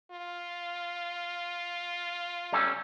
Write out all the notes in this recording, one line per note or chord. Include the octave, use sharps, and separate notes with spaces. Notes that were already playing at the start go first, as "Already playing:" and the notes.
F4
G3 C#4 A4